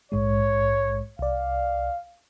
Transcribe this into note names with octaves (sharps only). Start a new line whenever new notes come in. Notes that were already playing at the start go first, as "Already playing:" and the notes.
A#1 G#2 G#3 C#5
C2 D5 F5